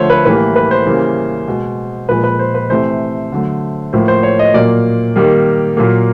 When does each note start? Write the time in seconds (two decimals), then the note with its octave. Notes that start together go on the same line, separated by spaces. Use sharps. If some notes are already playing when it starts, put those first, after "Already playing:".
Already playing: D3 F3 A3 C5 C#5
0.10 B4
0.25 A2 E3 G3 A#3 B4
0.56 B4
0.71 C5
0.86 C#3 E3 G3 A#3
1.48 B2 G#3
2.09 A#2 F3 G#3 B4
2.24 B4
2.39 C5
2.55 B4
2.70 C3 E3 A3 C5
3.32 D3 F#3 A3
3.93 A2 F3 A#3 C5
4.08 C5
4.23 C#5
4.39 D#5
4.54 A#2 F#3 A#3 D5
5.16 D#3 G3 A#3
5.77 A#2 F#3 A#3